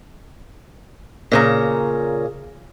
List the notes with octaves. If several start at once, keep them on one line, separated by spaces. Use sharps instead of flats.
A#2 C#3 A#5